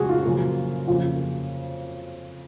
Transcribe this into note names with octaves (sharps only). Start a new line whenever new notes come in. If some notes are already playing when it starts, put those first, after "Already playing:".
Already playing: F2 C#3 G#3 F#4 G#4
F4
F#2 C#3 F3 A#3
F2 C#3 F3 A#3